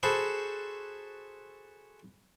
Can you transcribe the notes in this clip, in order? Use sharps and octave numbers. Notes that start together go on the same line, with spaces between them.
F#4 G#4 A4 C5 B5 C#6